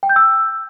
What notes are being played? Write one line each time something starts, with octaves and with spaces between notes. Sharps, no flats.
G5
G6
E6